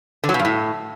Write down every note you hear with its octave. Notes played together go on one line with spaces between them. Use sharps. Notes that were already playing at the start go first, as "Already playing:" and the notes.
D3
F#3
B2
G2
A2